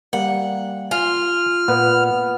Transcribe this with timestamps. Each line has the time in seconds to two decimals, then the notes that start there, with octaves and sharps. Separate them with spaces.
0.13 G3 A#3 F#5
0.91 F4 G#5 F6
1.68 A#2 B3